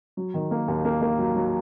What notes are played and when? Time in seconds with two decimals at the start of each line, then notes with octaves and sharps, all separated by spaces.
0.17 F#3
0.34 D#3
0.51 A#3
0.68 D#2
0.85 A#3
1.01 A#3
1.19 F#3
1.36 F#3